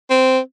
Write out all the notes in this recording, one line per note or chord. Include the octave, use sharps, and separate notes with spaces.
C4